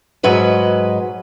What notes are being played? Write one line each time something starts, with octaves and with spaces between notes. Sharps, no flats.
G#2 F#3 B4 D#5